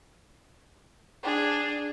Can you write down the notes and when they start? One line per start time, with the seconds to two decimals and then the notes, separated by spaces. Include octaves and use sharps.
1.23 D4 G#4